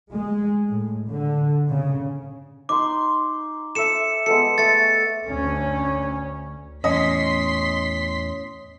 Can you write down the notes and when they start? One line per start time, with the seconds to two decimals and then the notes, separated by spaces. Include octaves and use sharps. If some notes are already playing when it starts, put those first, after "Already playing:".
0.13 G#3
0.69 A2
1.08 D3
1.69 C#3
2.69 D#4 C6 D6
3.75 A4 E5 C#7 E7
4.26 G#3 B3 A4 C#7
4.58 A3 A6 C#7
5.27 D2 C#4
6.84 E2 A2 C#4 D#5 C6 B6